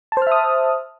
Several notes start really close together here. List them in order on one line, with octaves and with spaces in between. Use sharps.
A5 C5 F6 E5 D#6